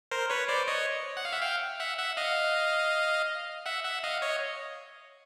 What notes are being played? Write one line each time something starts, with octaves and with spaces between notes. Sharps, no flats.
A#4 C5
B4 C#5
C5 D5
C#5 D#5
F#5
F5
E5 F#5
F5 G5
E5 F#5
E5 F#5
D#5 F5
E5 F#5
E5 F#5
D#5 F5
C#5 D#5